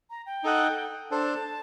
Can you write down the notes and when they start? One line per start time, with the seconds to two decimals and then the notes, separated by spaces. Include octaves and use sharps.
0.10 A#5
0.26 G5
0.44 D#4 A4 D#5 F#5
1.11 D4 A4 C5 A5